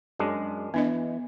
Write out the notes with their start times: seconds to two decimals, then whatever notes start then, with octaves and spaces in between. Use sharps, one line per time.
0.19 F#2 G#3 D4
0.74 E3 B3 D4 D#5